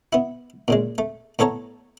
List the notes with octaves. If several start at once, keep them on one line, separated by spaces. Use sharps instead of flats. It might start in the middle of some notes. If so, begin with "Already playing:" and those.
B3 E4
A#2 C#3 G#3
A3
A2 B3 A4 C#5 A5 A#5